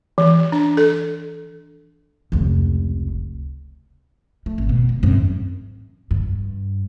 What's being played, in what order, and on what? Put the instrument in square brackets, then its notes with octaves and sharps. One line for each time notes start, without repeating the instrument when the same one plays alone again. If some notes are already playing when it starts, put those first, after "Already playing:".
[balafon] E3
D4
A4
[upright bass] F1 C#2
A3
G#1
B2
C2
G#1 F#2
G2